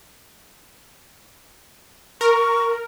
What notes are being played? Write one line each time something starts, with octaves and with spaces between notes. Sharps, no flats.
A#4 C#6